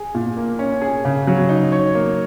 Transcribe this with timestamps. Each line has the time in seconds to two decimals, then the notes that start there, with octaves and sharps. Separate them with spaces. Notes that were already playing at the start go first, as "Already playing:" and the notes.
Already playing: G#4
0.15 A#2
0.37 A#3
0.59 C#4
0.82 G#4
1.05 C#3
1.27 F#3
1.49 D#4
1.72 C#5
1.95 A#3